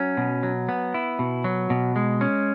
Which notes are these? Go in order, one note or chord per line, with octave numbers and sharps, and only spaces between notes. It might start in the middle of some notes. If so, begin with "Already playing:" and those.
Already playing: F#3 C#4
B2
F#3
B3
E4
B2
F#3
B2
G#3
C#4